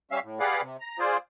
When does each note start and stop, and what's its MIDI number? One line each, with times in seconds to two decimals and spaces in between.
0.11 0.20 55
0.11 0.20 61
0.11 0.20 76
0.11 0.20 77
0.23 0.39 45
0.40 0.61 67
0.40 0.61 68
0.40 0.61 71
0.40 0.61 74
0.40 0.61 77
0.40 0.61 78
0.61 0.77 48
0.80 0.99 82
0.99 1.17 65
0.99 1.17 68
0.99 1.17 72
0.99 1.17 74